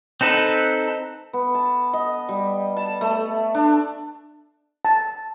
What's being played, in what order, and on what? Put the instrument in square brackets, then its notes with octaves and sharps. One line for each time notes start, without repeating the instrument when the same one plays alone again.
[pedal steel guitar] C4 D#4 A4 B4
[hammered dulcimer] B3
A5
D#5
G3
A5
A3
D4
[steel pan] A5